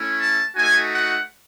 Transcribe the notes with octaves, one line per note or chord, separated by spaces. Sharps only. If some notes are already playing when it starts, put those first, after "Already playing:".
Already playing: A3 C#4 E4
A5
A3 D#4 F#4 G#5
F#5